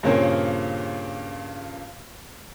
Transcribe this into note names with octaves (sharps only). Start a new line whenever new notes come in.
G2 A#2 C#3 A#3 C4 C#4